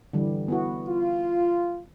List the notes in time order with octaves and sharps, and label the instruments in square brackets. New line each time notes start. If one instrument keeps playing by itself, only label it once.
[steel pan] D3 E3 G3
B3 E4 F#4
[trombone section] F4